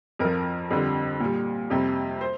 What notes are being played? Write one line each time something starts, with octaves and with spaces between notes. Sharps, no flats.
F2 F3 A#4
F2 D3 G3
A#2 G3
F2 C3 G3
C5